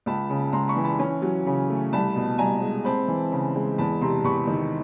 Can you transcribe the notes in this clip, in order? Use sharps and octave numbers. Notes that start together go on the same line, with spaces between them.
C#2 A5 B5
C#3
C#2 A#5 C6
B5 C#6
E3
A5 B5
C#4
F#3
C#3
A3
C2 A5 B5
B2
C2 G#5 A#5
G#3
C4 A5 B5
E3
C#3
G#3
E2 A5 B5
C3 A#5 C6
E2 B5 C#6
D#3